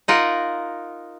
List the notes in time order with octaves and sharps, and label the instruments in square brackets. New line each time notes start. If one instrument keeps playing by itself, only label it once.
[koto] D#4 F4 A#4 F#5